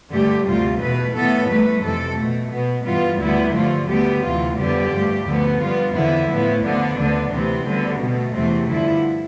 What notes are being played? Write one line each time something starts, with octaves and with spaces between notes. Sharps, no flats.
G2 D3 A3 G4
D2 C3 G3 F4
E2 B2 A3 B4
A2 E3 B3 A4
G2 E3 A3 B4
F2 C3 E3 A4
B2 A3
B2 B3
G2 E3 G3 B3 F4
D2 D3 G3 B3 E4
G2 D3 F3 A3 F4
D2 D3 G3 B3 G4
D2 C3 E3 F4
F2 D3 G3 B3 G4
G2 F3 A3
D2 D3 F3 B3
G2 F3 B3 F4
E2 D3 F3 B3 E4
A2 F3 B3
D2 D3 F3 B3 D4
D2 D3 F3 B3
D2 C3 E3 B3 C4
D2 D3 G3 B3
B2 A3
E2 C3 E3 A3 C4
G2 D3 F3 E4